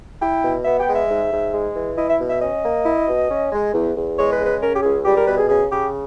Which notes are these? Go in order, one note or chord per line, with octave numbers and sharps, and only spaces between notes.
E4 G5
B2
B3 E5
G5
G#3
E5
G#2
G#2
G#3
E3
E4 D#5
E5
B2
E5
C#4 D#5
A#3
E4
B2
C#4
G#3
E2
E2
G#3 C#5
B4
C#3
B4
C#4 A#4
G4
C#2 G#4
G3 G4
A#4
B2 B4
G#4
C#3 G#4
C#3 G4